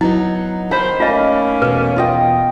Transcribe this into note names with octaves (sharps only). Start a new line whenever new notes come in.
F#3 B3 D#4 E4
D#3 D#4 C5 B5
A3 A#3 C#4 F4 D#5
E2 B2 B4
F4 D#5 G5